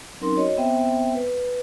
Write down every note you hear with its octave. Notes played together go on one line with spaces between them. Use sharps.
F#3 C4 C#4 D#4 A#4 C6
F#4 C#5 D#5
B3 C4 C5 E5 G5
B4